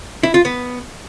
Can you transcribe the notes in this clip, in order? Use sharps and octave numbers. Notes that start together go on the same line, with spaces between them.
E4
F4
B3